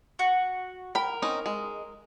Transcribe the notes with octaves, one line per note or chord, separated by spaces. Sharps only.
F#4
A#4 G5 B5
C4 C#4 D#4
G#3